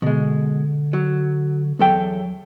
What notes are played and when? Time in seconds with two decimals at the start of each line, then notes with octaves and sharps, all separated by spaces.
0.02 B2 D3 G#3
0.93 F#3
1.79 E2 F#3 A4 G5